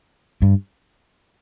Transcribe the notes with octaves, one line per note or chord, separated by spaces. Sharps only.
G2